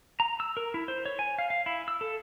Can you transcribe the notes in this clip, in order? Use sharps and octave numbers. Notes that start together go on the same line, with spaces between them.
A#5
E6
A#4
E4
C5
C#5
G#5
F5
F5
E4
E6
A4